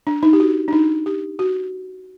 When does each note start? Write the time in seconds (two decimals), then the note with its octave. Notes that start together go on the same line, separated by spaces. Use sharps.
0.07 D4
0.23 D#4
0.33 G4
0.40 F#4
0.68 D4
0.73 D#4
1.06 G4
1.39 F#4